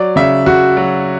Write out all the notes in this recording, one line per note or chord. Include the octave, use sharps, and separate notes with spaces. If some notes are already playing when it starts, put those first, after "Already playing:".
Already playing: F#3 D5
C#3 E5
C#3 F#4
F#3